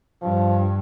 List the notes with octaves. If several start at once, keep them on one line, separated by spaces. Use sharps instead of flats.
G2 F3